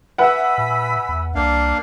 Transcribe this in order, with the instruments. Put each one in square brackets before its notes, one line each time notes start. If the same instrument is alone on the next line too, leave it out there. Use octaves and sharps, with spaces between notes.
[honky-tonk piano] B4 E5 F#5 [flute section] G#5 B5 E6
[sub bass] A#2
E2
[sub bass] C2 [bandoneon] A#3 D4 F5